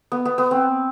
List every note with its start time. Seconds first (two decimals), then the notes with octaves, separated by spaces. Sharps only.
0.12 B3
0.25 B3
0.38 B3
0.51 C4